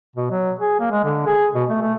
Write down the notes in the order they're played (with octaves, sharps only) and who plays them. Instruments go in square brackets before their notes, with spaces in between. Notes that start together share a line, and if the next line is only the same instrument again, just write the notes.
[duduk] B2
F#3
G#4
A#3
G#3
D3
G#4
B2
A3
A3